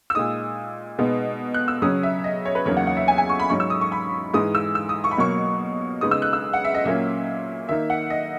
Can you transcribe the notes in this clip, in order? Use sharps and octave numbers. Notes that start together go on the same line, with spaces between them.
E6
A#2 G#3 D#4 D#6
B2 G#3 B3 D#4
F#6
E6
C#3 F#3 C#4 D#6
E5
D#5
C#5
B4
E2 C#3 F#3 A#3 D#4 C#5
F#5
F#5
E5
G#5
G#5
C#6
B5
G#2 F#3 C#4 C#6
E6
D#6
C#6
B5
G#2 E3 G#3 D#6
E6
E6
D#6
C#6
B5
B2 F#3 A#3 C#6
C#3 G#3 B3 D#4 D#6
E6
F#6
E6
F#5
E5
D#5
A#2 F#3 A#3 C#4 E5
D#3 A#3 D#4 E5
F#5
D#5